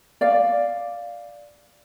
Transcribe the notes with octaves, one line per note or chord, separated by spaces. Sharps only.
D5 F5